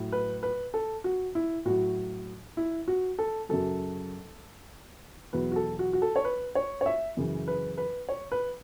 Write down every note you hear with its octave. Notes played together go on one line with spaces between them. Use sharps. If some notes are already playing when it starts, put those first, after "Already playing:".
Already playing: A2 F#3
B4
B4
A4
F#4
E4
A2 F#3 F#4
E4
F#4
A4
F#2 C#3 F#3 A4
E2 B2 F#3 B4
F#4
A4
F#4
F#4
A4
C#5
B4
C#5
C#5
E5
F#2 C#3 E3
B4
B4
C#5
B4